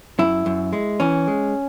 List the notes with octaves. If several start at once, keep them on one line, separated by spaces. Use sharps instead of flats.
F#2 E4
F#2
G#3
E3 C#4
G#3